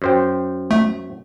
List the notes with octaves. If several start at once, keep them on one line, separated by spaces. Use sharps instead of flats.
F#2 C5 G5
A3